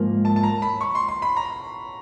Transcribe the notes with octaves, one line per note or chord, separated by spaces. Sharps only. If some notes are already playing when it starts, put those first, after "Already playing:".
Already playing: G#2 F3 A#3
A5
A5
A#5
B5
C#6
C6
C6
B5
A#5